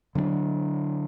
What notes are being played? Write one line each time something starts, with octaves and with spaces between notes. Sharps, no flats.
D3 F#3 B3 D4